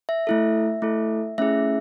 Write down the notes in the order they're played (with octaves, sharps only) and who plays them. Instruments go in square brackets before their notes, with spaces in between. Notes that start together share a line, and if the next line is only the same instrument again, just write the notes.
[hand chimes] E5
A3 E4 A4
A3 E4 A4
A3 C#4 E4 G#4 E5